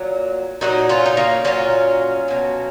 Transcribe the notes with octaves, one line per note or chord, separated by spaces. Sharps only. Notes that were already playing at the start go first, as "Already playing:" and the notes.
Already playing: A#2 F#3
A#2 F#3 D#4 F#4
C#4 F4
D#4
A#3 C#4
A#2 F#3 C#4 F4
B2 F#3